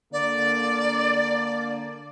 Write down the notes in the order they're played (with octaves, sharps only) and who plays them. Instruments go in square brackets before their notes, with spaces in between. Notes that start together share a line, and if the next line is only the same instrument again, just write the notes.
[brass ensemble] D3 A#3 [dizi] D5